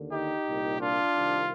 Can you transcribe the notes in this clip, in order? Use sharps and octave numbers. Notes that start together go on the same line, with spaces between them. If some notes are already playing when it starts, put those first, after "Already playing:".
Already playing: D#2 D3
D#4 G4
C2 A#2
D4 F4
C2 C3 D#3